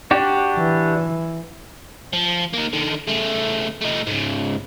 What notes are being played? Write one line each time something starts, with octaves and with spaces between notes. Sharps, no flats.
D4 F#4 G4
E3
F3
A#3 D#4
D3 D#3
C#3 A3
A3 D#4
G#2 C#3